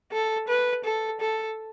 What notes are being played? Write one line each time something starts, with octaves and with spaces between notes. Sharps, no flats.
A4
B4
A4
A4